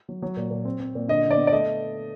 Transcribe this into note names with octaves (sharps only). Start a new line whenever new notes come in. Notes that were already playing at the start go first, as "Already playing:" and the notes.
F#3
F#3
A#2
A#2
C4
C4
A#2
D3 D#5
D3
D5
B3
D5
A3 D#5